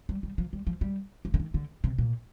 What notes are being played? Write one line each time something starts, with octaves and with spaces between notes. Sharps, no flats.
G3
G3
F3
G3
F3
G3
F3
D3
D#3
D3
C3
A#2